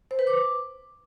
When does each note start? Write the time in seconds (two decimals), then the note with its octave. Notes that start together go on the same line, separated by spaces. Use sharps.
0.11 C5
0.19 B4
0.27 D6